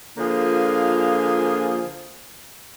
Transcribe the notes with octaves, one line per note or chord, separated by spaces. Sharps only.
D3 F3 A#3 F4 G#4